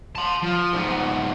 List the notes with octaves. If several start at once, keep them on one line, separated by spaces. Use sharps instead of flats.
A5 C6
F3
G#2 B3